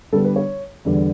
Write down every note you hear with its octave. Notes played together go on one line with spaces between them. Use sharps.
D3 G3 B3 D4 A4
B4
C#5
E2 D3 G3